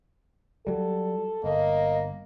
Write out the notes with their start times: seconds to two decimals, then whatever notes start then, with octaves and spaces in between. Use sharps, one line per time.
0.67 F#3 G3 A4
1.44 G1 A#3 D#5